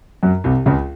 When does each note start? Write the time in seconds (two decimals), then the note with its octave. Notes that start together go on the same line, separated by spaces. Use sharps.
0.23 F#2 F#3
0.44 C2 C3
0.66 C#2 C#3